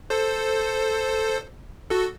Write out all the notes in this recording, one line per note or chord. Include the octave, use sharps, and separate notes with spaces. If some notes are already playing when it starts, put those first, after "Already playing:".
A4 C5
F#4 A4